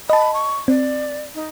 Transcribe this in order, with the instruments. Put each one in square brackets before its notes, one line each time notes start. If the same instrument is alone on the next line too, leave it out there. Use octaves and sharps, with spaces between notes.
[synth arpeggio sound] D#5 A5 [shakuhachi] B5
[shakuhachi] C#6
[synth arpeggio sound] C4 [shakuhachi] D5
[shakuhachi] D#4